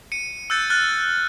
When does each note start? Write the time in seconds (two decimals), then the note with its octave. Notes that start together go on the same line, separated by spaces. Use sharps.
0.12 C#7 D#7
0.50 E6 F#6 G6 A6 C#7
0.70 F6 F#6 A6